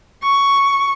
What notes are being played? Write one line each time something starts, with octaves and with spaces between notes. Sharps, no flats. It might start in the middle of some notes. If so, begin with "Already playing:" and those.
C#6